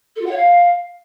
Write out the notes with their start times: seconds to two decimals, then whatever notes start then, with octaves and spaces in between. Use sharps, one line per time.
0.16 A4
0.21 F4
0.26 F#5
0.31 C#5
0.36 F5